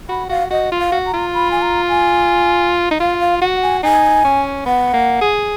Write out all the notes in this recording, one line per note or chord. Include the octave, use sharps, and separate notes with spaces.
F#4 B5
F#4 F5
F#4 D#5
F4
F5
F#4
A#5
F4
B5
G#5
A#5
G#5
D#4
F4 F5
F5
F#4 F#5
G#5
D#4 G#5
C#4
B3 F#5
A#3
G#4